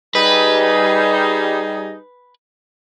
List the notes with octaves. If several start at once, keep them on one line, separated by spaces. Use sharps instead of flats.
G3 D#4 G#4 B4